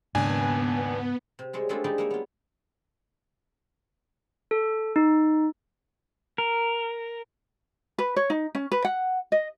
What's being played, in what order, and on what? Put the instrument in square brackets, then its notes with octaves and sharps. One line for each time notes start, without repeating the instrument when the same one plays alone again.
[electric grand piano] D#2 D4 G#5 [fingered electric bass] G#2 C#3 [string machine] B3
[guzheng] C3
G3 G#3 C4 C#5
G#3 A3 C4 D4 E4 F4
G3 G#3 D#4 E4 G4 D5
A#3 E4 C#5
B3 F4
[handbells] A4
D#4
[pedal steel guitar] A#4
[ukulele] B4
C#5
D#4
C#4
B4
F#5
D#5